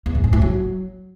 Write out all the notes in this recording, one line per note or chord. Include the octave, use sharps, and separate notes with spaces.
E2
A#2
G#2
A2
F#3